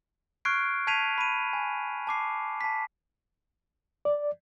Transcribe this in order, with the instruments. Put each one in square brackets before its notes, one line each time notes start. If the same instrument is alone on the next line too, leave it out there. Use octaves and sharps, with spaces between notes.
[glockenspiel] C#6 F6 F#6 G#6 C7 D7
A5 G#6 B6 C7 D#7 F7
B5 D#7
G#5
A5 D6 C7
A5 B6
[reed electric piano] D5